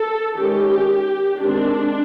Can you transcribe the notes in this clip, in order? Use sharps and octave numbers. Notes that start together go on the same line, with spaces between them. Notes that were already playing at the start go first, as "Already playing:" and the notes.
Already playing: A4
D#3 G#3 C#4 G4
D#3 G#3 C4 D4